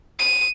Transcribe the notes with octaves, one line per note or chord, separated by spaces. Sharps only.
D#7